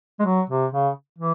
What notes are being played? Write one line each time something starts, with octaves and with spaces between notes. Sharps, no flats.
G#3
F#3
C3
C#3
E3